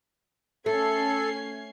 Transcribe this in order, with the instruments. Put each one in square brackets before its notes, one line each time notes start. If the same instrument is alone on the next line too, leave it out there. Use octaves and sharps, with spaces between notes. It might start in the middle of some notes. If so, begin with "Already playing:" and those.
[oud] A3 [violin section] C#4 G#6 C7 [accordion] A4